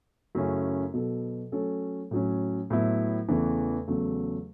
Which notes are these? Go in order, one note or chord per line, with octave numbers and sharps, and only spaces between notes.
F#2 C#3 A3 C#4 E4
B2 F#3 B3 A4
F#3 A3 C#4 A4 C#5
A2 F#3 C#4
A2 F#3 B3 E4
E2 C#3 E3 A3
E2 C#3 F#3 A3